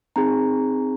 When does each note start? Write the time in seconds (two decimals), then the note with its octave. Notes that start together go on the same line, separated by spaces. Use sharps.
0.16 C4 D#4 G#4 A#5